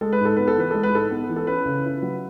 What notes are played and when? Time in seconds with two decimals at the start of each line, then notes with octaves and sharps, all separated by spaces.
0.01 G#3 A4
0.13 B4
0.20 G#2 A4
0.37 B3 B4
0.48 A4
0.57 E3 B4
0.71 G#3 A4
0.83 B4
0.93 G#2 A4
1.11 B3
1.29 E3
1.36 A4
1.47 C#4 B4
1.65 C#3
1.85 E4
2.02 F#3